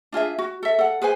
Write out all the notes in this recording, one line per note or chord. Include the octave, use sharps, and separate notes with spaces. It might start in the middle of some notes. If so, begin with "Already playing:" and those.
D4 F4 G#4 E5
F#4
A4 E5
A4 F#5
G#4 B4 C5 G#5